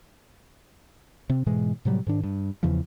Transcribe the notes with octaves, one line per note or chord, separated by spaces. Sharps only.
C3 C4
G#2 B2 E3 G#3
A2 C3 F#3 G3
G#2 D#3 D4
G2
E2 C#3 E3 F3